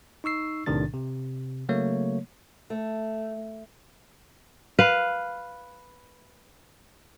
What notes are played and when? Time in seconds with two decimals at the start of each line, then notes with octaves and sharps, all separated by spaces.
0.24 D#4 C#6 E6 C7
0.66 B1 A2 C3 D#3 D4 A6
0.94 C3
1.69 C#3 F#3 A3 A#3 C#5
2.70 A3
4.79 B4 F5